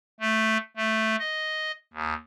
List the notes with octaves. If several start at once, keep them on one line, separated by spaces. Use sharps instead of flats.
A3
A3
D#5
D#2